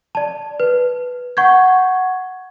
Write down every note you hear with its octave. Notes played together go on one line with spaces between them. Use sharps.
D5 A5
B4
F#5 C#6 G6 G#6